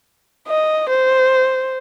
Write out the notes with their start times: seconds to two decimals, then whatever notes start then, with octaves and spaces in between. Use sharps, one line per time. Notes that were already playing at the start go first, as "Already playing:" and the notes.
0.48 D#5
0.89 C5